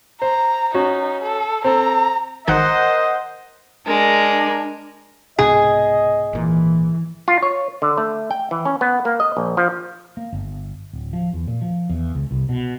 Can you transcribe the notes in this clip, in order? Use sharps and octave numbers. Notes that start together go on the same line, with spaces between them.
C5 A#5
C#4 D#4 F#4
A4
C4 A4 A#5
G#1 D#3 A#4 C5 D#5 F#5 G6
G#3 D4 A#4
C2 G#2 B2 G#4 D#5
G#1 A#2 E3
F4
C#5
D3
A3
G5
E3
C#4
B3
A#3
D#5
A#1
F3
A#3
G1
D1
F3
E2
A#2
F3
E2
C#2
C2
B2